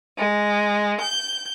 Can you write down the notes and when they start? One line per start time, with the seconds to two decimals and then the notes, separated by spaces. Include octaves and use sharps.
0.17 G#3
1.00 G6